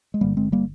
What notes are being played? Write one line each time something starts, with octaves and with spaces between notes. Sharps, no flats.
G#3
G1 G2 D3 G3 A#3
G#3 C4
G3 A#3